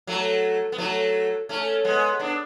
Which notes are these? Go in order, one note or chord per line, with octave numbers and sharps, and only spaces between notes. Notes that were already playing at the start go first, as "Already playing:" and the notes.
F#3 A3
B3
F#3 A3
A3 C#4
G#3 B3
B3 D4